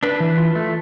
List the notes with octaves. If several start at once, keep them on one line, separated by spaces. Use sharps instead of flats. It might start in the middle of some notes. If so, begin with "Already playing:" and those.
D4 B4
E3
F4
A3